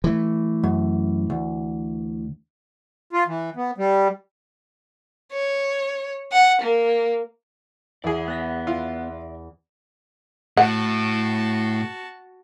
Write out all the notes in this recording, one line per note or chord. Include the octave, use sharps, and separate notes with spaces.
E3 A3
F#2
D2
F4
E3
B3
G3
C#5
F#5
A#3
E2 E4 G#4 D5 E5
B3 F#6 A#6 B6
E4 F4
A2 F#4 F#5 A5